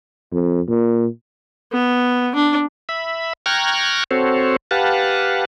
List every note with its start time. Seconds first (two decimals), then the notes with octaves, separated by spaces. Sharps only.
0.32 F2
0.69 A#2
1.72 B3
2.35 D4
2.89 E5 B5
3.46 G5 A#5 C#6 F6 F#6 G#6
4.11 C4 F#4 A4 C5 C#5
4.71 G4 B4 F5 F#5 A5